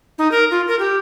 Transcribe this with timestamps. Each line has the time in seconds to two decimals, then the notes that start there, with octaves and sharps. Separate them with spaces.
0.18 D#4
0.32 A#4
0.51 F4
0.68 A#4
0.79 G4